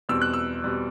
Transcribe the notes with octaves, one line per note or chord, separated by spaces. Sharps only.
E2 B2 G3 C4 E6
F#6
E6
B2 G3 C4